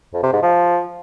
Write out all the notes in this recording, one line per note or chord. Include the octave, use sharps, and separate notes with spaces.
F2
C3
G#2
F3